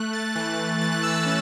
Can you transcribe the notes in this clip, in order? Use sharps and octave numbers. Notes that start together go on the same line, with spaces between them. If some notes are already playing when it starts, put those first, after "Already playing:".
Already playing: A3 F#6
A6
E3 F#6
F#6
E3 A6
F#6
E6
F#6
C#4